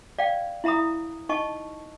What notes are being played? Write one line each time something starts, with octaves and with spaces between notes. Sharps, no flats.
D5 F5 G5
E4 E5 A#5 B5 D#6
D#4 D#5 A5 C#6